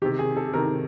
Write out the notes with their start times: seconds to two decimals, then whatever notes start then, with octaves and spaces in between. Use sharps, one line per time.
0.02 D#3 G4
0.05 C3
0.19 G#4
0.37 A4
0.53 C3 D#3 A#4